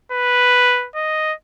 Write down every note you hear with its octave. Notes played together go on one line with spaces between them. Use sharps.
B4
D#5